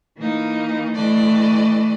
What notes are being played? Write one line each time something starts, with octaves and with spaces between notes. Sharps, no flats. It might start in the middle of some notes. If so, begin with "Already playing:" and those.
E3 A#3 D#4
E3 A3 D4 D5 D#5